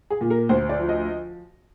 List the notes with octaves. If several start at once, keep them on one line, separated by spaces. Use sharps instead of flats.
G#4
A#2
A#4
D2 C5
D5
F3
D#5